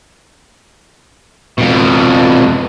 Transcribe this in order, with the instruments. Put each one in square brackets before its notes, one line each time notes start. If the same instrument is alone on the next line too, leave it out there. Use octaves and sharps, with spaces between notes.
[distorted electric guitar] F2 B2